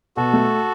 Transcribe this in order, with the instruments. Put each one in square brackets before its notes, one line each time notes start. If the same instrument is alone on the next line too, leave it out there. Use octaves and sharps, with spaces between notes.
[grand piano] B2 [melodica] F#4 A4
[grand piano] A3